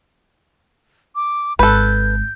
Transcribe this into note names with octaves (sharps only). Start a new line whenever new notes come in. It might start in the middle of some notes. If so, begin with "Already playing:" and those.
D6
G#1 A4 B4 G6